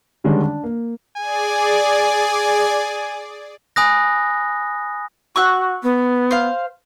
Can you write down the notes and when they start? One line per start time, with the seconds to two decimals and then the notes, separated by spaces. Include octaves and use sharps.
0.24 D3 D#3 G3 G#3 C#4 D4
0.42 D4
0.64 A#3
1.17 G#4 D5 G#5
3.76 G#5 B5 D#6 F#6 A#6
5.36 F#4 C#6 E6 F#6
5.83 B3
6.31 C5 F5